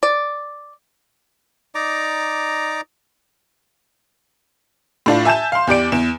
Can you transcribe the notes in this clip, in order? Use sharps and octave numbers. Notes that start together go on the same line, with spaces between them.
D5
D#4 D5 A#5 D6
A2 D4 F4
E5 G#5 A5 G6 E7
F5 C6
E2 G4 D5 D7
E2 E7